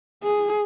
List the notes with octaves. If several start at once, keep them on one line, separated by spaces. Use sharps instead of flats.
G#4